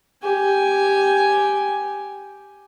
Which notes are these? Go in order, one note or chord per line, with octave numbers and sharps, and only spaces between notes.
G4 G#5